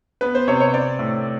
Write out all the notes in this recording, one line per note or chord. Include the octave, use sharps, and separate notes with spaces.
B3 B4
C5
C3 C#5
C#5
C4 D5
A2